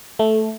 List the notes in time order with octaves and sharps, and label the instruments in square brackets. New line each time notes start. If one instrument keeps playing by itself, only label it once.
[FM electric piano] A3